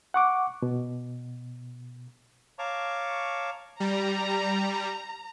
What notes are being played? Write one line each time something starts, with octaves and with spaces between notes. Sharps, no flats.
F#5 C#6 D6
B2
C#5 F5 A5 A#5 C#6 D6
G3 A#5